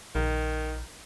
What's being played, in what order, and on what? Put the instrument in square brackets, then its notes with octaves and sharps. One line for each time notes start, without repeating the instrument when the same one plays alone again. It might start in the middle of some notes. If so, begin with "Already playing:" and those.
[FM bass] A#1 [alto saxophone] D#3